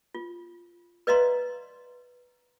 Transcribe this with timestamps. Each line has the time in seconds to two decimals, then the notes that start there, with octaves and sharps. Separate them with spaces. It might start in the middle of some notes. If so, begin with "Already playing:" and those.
0.15 F4
1.07 B4 D5 D#5 F5 A#5 C6